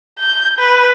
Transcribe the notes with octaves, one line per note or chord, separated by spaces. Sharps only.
G6
B4